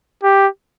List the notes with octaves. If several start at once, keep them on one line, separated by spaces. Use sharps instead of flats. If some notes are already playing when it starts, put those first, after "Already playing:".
G4